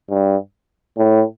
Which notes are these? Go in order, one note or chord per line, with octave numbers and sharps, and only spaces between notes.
G2
A2